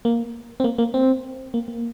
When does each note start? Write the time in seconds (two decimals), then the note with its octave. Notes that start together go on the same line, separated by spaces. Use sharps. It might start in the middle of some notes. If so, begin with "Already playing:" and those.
0.05 A#3
0.60 C4
0.64 A#3
0.78 A#3
0.94 C4
1.54 A#3
1.68 A#3